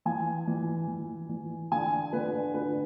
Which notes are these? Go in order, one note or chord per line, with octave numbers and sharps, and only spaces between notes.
E3 G#5
E3
E3
E3
D3 G#5
D3 B4
D2 B4